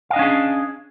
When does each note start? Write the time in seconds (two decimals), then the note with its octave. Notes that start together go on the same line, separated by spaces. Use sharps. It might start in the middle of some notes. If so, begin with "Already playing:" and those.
0.10 F5
0.13 D#5
0.16 D4
0.19 C#4
0.22 G#4